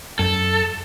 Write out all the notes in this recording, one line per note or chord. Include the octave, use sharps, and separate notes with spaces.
F#2 A4